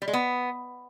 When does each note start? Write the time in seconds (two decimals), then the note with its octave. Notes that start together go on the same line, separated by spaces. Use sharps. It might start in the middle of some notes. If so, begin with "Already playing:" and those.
0.02 G3
0.08 G#3
0.13 B3